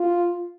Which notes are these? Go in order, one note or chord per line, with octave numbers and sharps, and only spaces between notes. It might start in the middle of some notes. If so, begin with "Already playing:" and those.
Already playing: F4